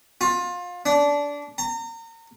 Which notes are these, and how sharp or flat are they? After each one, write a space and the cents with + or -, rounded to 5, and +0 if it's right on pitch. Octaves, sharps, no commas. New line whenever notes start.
F4 +25
D4 -20
A#5 -30